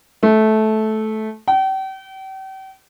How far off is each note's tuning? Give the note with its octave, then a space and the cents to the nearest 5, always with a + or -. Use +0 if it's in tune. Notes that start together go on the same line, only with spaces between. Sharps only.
A3 -15
G5 -40